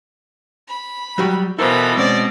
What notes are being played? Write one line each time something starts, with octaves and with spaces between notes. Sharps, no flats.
B5
F#3 G3 F#4
B2 E3 E4 F4 A4 A#4 C5 B5
B2 G#3 C4 C#4 D5